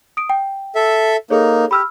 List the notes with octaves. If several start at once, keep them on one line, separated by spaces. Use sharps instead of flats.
D#6 D7
G5
A4 E5
A#3 D#4 G#4 A4 C#5
G4 B5 E6 F6